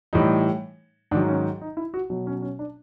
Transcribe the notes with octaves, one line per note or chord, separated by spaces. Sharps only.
A2 E3 G3 D#4
G#2 D#3 F#3 D4
C#4
D#4
E4
F#4
B2 F#3
C#4
C#4
D4